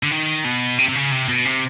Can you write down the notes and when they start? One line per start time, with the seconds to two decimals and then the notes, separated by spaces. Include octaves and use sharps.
0.03 D3
0.11 D#3
0.45 B2
0.78 C3
0.89 C3
0.95 C#3
1.12 C3
1.28 B2
1.45 C3